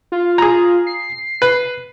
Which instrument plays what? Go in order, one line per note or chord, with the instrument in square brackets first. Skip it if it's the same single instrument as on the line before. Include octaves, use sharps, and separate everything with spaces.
[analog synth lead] F4
[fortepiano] G#4 A#5
[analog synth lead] C7
[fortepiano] B4